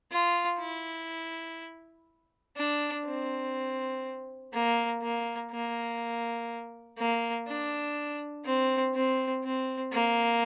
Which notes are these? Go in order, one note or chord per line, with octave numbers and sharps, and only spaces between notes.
F4
E4
D4
C4
A#3
A#3
A#3
A#3
D4
C4
C4
C4
A#3